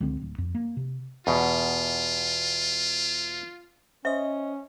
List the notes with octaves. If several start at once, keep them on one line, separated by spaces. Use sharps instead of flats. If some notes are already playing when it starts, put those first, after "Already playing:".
C#2 D3 C4
D1
F2
A#3
C3
E2 B2 F4
C#4 C5 D#5 E5